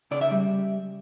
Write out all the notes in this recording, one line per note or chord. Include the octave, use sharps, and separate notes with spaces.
C#3 D5
E5
G3